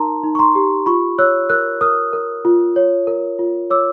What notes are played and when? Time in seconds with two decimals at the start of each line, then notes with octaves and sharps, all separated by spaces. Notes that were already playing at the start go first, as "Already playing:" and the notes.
Already playing: D#4 A#4 A5 A#5 C6
0.23 D#4
0.35 C#6
0.39 A#5 C6
0.55 G4
0.86 F4 B5 C#6
1.18 C#5 E6 F#6
1.49 A#4 E6 F#6
1.81 A#4 D#6 F6
2.13 A#4
2.45 F4
2.76 C#5
3.07 A#4
3.39 F4
3.70 C#5 D6 E6